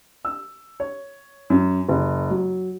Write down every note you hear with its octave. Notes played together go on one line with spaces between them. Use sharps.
E6
C#5
F#2
F#1
F#3